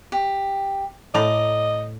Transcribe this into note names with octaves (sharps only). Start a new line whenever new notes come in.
G4
A2 D5 D#5 A#5 D6